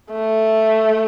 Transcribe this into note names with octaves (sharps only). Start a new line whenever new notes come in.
A3